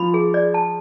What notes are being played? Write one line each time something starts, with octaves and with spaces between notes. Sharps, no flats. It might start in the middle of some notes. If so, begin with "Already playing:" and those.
Already playing: F3 B5
G#4
D5
A5